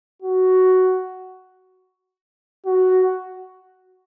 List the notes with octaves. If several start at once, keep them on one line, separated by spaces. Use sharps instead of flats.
F#4
F#4